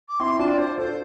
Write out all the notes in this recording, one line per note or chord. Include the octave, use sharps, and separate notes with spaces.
D6
C4 E4 C6
D4 F4 A5
D5
C5
F4 A4 C5